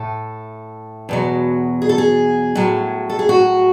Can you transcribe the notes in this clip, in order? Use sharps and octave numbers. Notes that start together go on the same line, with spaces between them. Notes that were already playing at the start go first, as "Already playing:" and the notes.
Already playing: A2 A4
E2 B2 F#3
G#4
A4
G#4
A2 F#3
A4
G#4
F#4